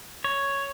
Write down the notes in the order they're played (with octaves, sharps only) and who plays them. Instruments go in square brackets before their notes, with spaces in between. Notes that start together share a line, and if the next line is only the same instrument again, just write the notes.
[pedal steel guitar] C#5